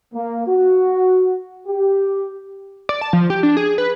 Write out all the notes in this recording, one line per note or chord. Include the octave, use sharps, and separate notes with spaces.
A#3
F#4
G4
D5
A5
F3
G4
D4
G#4
B4